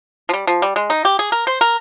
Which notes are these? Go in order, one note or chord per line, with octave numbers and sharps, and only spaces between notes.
F3
G3
F3
G3
G#3
D#4
G4
G#4
A#4
C5
A#4